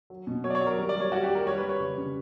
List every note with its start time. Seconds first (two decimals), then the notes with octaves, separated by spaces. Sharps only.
0.10 F#3
0.27 B2
0.44 F#3 C#5
0.50 D5
0.55 C#5
0.61 F#3
0.67 A#4
0.78 G3 A#4
0.89 D5
0.95 G3 C#5
1.12 G3 F#4
1.23 G4
1.30 G3
1.35 A#4
1.46 G3 C#5
1.58 B4
1.63 G3
1.69 C#5
1.80 C#3
1.98 C#3